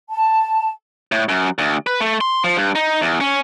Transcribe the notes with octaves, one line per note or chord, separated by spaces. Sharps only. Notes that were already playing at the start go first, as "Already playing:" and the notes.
A5
A2
F#2
D2
B4
A3
C6
F3
G2
D#4
E2
C#4